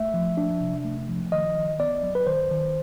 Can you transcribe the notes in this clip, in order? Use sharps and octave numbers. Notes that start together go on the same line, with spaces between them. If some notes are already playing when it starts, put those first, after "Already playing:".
Already playing: A3 E5
F3
D4
C3
A3
F3
D#3 D#5
D#3
B3 D5
F#3
B4
D#3 C5
D#3